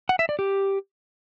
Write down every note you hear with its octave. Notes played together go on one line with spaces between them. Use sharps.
F#5
E5
D5
G4